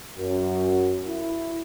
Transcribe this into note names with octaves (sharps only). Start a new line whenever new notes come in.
F#2
E4